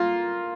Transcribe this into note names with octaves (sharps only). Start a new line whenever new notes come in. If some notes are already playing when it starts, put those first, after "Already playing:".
Already playing: A#3 F4